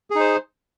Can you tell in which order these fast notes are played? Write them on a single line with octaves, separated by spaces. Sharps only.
G#4 D#4 C5